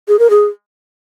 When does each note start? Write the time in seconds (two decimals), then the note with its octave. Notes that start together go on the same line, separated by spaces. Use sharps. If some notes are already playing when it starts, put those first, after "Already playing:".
0.08 G#4
0.19 A#4
0.30 G#4